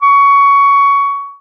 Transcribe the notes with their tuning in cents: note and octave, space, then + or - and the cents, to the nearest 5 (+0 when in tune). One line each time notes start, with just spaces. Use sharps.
C#6 +15